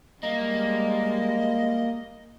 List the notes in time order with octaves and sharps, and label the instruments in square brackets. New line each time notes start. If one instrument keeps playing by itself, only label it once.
[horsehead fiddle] G3 G#3 [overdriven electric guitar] A#3 [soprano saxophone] D#5